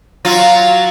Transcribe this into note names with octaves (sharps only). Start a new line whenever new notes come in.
F#3 F4